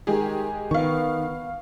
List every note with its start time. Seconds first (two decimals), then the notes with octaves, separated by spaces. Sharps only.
0.07 D#3 G#3 G4 G#4
0.71 D#3 B3 F5 C#6